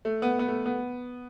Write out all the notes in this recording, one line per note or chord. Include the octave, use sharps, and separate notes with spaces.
A3
B3
B3
A3
B3